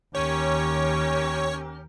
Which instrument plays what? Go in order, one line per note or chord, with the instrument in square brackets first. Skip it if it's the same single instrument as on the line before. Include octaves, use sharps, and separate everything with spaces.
[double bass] D#2 [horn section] C#4 G4 A#4 [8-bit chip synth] C#5